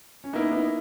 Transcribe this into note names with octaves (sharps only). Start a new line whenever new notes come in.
C#4
A#3 B3 D#4 E4 A#4
B3 D#4